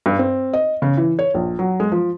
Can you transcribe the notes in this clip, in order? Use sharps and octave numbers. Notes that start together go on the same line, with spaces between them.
G2
C4
D#5
C#3
E3
C#5
A#1
F#3
G#3
F3